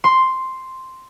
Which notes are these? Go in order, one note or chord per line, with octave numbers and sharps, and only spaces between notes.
C6